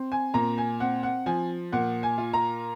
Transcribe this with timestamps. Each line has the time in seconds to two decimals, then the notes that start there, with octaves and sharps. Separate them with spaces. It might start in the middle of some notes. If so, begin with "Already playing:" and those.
Already playing: C4
0.12 G#5
0.34 A#2 A#5
0.58 G#5
0.80 C4 F#5
1.03 F#5
1.26 F3 G#5
1.72 A#2 F#5
2.03 G#5
2.18 F4
2.33 A#5